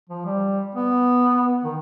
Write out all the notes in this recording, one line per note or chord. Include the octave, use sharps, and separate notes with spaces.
F3
G3
B3
D#3